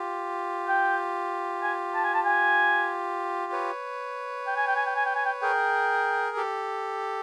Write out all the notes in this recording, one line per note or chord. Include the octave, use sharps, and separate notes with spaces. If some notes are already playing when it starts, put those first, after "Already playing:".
Already playing: F4 G4
G5
G#5
A5
G#5
A5
G#5
B4 C#5
G5
G#5
G5
G#5
G5
G#5
G5
G#5
G5
G#4 A#4 G5
G4 A4